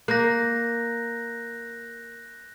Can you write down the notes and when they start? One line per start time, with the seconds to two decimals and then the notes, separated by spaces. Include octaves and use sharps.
0.08 A#3 F#6 G6 A#6